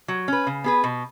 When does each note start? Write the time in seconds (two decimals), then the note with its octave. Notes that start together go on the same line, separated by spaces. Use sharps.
0.08 F#3
0.28 C#4 B4
0.47 C#3
0.64 B3 G#4 B4
0.84 B2